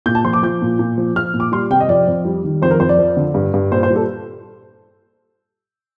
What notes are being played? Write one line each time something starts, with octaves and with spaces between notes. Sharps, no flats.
A#2 G6
A5
F3 C6
D6
F3 G6
A#2
A#2
F3
F3 F6
A#2
D6
G3 C6
C3 G5
D#5
F2 D5
F2
G3
D#3
F2 C5
A#4
F2 C5
D5
F3
D3
G2
G2
A#2 C5
C5
G3
A4